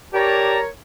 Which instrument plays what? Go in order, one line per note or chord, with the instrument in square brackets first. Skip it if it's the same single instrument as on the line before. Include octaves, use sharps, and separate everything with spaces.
[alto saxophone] G4 [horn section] A#4 C#5 [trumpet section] D5 A5 A#5